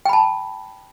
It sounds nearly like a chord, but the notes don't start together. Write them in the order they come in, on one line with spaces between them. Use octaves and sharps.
G5 B5 A5